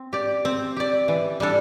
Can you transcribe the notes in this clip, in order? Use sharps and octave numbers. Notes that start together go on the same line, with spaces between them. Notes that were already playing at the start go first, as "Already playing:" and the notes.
Already playing: C4
G4 D5
C4
G4 D5
E3
G3 D4 A4